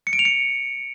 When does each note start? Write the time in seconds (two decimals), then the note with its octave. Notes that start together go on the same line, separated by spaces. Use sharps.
0.07 C#7
0.13 D7
0.19 F7
0.25 C#7